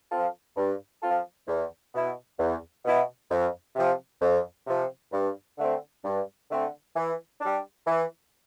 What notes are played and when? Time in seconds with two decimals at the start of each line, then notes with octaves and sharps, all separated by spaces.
0.11 F3 C4 F4 A4
0.57 G2
1.02 F3 C4 F4 A4
1.47 E2
1.94 B2 B3 E4
2.39 E2
2.85 B2 B3 E4
3.31 F2
3.75 C3 F3
4.21 F2
4.67 C3 F3
5.12 G2
5.58 D3 A3 C4
6.04 G2
6.50 D3 A3 C4
6.96 E3
7.41 G3 D4
7.87 E3